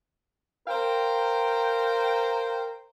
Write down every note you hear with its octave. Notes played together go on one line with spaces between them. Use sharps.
A#4 C5 F5 G5